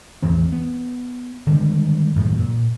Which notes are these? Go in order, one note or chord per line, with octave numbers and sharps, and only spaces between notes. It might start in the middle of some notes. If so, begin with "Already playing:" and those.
A1 E2 E3 C4
B3
D3 D#3 G3 G#3
F#2 A2 D#3
A#2